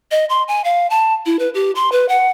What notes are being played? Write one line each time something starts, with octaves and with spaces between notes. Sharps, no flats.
D#5
C6
G#5
F5
A5
E4
B4
G4
C6
B4
F#5